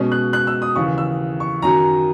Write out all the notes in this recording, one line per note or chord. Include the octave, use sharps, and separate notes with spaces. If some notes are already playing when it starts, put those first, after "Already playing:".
Already playing: B2 G#3 C#4
F#6
F#6
E6
D#6
D#2 C#3 E3 C#6
E6
C#6
F#2 D#3 F#3 A#5